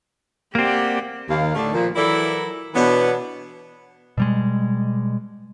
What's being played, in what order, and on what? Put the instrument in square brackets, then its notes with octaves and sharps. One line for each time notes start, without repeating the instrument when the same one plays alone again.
[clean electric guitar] A#3 C4 [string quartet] G4 D5 F#5
[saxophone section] D#2 F5
A2 D3 A3 D4 D#4
A#2 F3
E3 F#3 E4 A4 A#4 D5
B2 E3 B3 D4 C#5 F#5
[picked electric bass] B2 G3 G#3